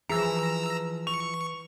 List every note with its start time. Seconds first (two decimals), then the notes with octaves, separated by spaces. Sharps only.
0.09 E3 F3 E4 G#4 A#5 E6
1.07 C#6 F7